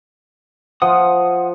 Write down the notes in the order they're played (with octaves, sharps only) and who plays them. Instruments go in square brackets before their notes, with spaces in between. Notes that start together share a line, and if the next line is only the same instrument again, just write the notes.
[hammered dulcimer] F3 [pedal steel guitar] F#5 D#6